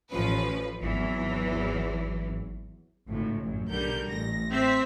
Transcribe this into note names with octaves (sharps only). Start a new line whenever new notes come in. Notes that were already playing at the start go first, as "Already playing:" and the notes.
A1 F3 C#4 B4
G#1 E2 E3 F#3
G#1 C#2 A2
A1 F#2
B1 D3 G3 A#4 G6
A1 A#6
C4 E5 B6